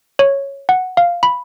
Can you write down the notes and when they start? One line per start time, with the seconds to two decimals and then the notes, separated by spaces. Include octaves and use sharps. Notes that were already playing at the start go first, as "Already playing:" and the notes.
0.19 C#5
0.69 F#5
0.97 F5
1.23 B5